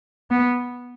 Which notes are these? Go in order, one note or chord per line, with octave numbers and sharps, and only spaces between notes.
B3